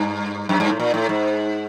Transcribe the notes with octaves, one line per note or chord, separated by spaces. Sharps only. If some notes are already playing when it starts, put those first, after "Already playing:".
Already playing: G2
F#2
G2
A2
A#2
A2
G#2